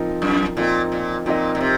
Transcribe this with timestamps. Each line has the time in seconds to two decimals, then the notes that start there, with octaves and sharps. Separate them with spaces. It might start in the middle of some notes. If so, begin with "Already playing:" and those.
Already playing: F3 C4 D#4 A#4 D#5
0.22 F#2
0.57 A#2 F3 C4 D#4 A#4 D#5
0.92 A#2
1.26 A#2 F3 C4 D#4 A#4 D#5
1.55 A#2
1.61 C3